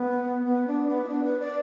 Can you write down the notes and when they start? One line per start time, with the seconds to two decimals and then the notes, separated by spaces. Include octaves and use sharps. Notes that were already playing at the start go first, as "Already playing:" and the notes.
Already playing: B3
0.46 B3
0.67 D4
0.88 B3
1.04 E4
1.08 D4
1.24 B4
1.40 D5